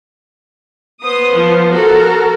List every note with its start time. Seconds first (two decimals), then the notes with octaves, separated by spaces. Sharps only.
1.03 B3 C5 D#6
1.33 F3
1.73 F#4 A4 A#4